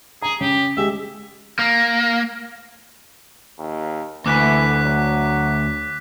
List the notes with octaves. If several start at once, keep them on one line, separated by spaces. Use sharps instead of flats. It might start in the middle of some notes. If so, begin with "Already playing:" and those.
G#4 A#5
C#3 G4
G#3 G4 G#4 E5
A#3
D#2
D2 E3 D6 F#6 B6
F#3